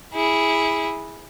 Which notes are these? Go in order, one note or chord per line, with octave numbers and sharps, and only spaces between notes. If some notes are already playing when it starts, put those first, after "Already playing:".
E4 G#4